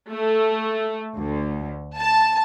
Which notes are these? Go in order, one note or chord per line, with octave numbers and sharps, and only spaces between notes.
A3
D2
A5